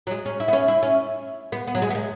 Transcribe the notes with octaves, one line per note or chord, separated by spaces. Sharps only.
F#3
G#3
C#4
E4
B3
C#4
E4
C#4
B3
B3
F#3
G#3
B3
G#3